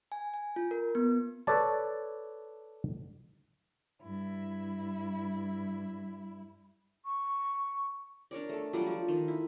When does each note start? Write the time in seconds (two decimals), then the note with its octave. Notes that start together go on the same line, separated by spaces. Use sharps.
0.12 G#5
0.34 G#5
0.56 F4
0.71 A#4
0.95 B3
1.47 A4 B4 C#5 D5 A5
4.01 G2 E4
7.05 C#6
8.31 D4 A#4 C#5 D5
8.49 A3 A4
8.73 F#3 G3 F4 D5
8.86 F3
9.08 D#3
9.28 E4